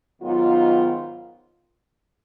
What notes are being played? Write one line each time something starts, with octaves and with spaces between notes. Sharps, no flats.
G#2 D#3 F#3 B3 F4